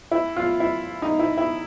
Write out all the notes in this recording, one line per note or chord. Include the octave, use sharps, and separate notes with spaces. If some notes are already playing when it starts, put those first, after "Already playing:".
E4
F4
E4
D#4
E4
E4